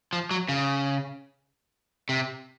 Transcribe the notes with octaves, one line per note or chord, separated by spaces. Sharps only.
F3
F#3
C#3
C3